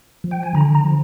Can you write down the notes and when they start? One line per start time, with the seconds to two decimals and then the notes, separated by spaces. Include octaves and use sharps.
0.24 F3
0.31 G5
0.43 G#5
0.55 D3 A#5
0.75 A#5
0.84 F3